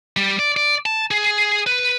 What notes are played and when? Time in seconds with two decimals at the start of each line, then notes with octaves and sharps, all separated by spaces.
0.17 G3
0.39 D5
0.57 D5
0.86 A5
1.11 G#4
1.67 B4